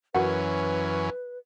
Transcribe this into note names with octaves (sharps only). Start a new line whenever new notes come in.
F#2 E3 C#4 F#4 A#4 B4 F#5